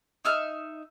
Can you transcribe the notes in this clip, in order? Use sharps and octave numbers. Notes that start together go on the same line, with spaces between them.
D#4 E5 F6